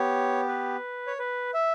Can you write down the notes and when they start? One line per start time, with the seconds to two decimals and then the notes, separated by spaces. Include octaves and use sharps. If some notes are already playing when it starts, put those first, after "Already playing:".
Already playing: B3 G4 C#5
0.48 B4
1.07 C#5
1.19 B4
1.54 E5